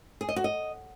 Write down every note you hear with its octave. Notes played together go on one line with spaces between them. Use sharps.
G#4
D#5
F#4
D#5